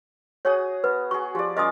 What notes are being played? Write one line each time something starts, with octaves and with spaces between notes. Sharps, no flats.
F#4 G#4 C#5 D#6
B3 B4
F#4 G#4 C#6
F3 G4 D5
C#4 F4 A#4 D#5 D#6